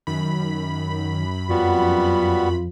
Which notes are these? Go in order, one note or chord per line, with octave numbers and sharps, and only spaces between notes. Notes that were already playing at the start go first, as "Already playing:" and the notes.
F#2 D#3 B5
F2 G3 B3 F4 F#4